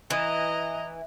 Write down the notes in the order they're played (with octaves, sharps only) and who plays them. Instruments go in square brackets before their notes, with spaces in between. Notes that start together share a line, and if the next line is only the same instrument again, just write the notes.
[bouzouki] E3 [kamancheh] D#5 A#5